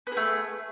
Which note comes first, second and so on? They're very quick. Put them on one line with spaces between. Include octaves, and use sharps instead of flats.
B3 G#4 A3